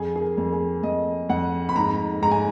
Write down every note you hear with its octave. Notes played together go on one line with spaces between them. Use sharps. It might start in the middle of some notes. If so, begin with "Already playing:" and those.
Already playing: F2 G#4
G#4
A#4
F2
G#4
F2 D#5
F2 F#5
B5
G#2 A#5
G#2 A#5
G#5